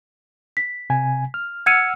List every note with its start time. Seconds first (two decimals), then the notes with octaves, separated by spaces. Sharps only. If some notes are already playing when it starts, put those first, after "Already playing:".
0.57 B6
0.90 C3 G#5
1.34 F6
1.66 F#5 E6 F6 G#6 C#7 D#7